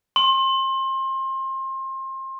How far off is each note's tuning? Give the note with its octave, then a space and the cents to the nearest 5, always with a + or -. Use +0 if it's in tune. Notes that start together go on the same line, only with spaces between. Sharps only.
C6 +30